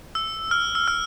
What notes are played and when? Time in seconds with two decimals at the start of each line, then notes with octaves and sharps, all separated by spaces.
0.15 E6
0.51 F6
0.75 E6
0.88 F6